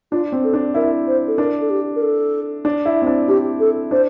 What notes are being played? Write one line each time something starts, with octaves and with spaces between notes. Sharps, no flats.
D4 F4
C4
A4
D4
E4 A#4
C5
A4
D4 A#4
A4
G4
A#4
A4
D4
E4
C4
D4
D4 G4
A4
D4 C5